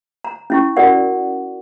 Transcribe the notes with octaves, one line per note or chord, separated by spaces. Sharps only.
A#5
C#4 E4 C#6
F#4 A#4 D5 F#5